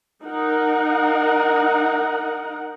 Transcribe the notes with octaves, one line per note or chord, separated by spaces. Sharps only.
D#4 A#4 F#5